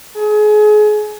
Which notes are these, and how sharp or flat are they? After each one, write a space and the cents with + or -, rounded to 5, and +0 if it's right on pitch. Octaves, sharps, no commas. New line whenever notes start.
G#4 +30